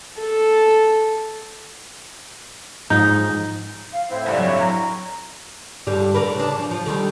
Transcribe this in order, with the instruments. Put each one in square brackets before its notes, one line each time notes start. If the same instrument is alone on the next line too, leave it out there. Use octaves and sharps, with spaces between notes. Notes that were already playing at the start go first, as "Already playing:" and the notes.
[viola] A4
[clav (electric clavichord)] G#2 F3 A#5 [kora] D#4
[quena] F5
[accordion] A2 C4 E4 [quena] C5
[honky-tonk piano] F#1 G2 D4 [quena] F#5
[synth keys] F#3 C#6 [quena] C#5
[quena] A#5
[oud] G2 D3 G3
D3 A#4 B4
C#3 D4
F3
F3
D3 D#3 G3